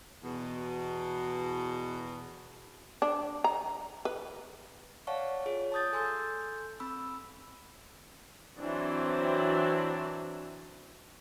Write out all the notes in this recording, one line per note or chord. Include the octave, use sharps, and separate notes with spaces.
E2 B2
D4
A#5
B4
C#5 D5 F5 F#5 A5 C#6
F4 G#4 C#5
A5 D6 D#6 G6 A6
A4 G#5 C6 E6 G6
C4 B5 E6
E3 F#3 C4 D4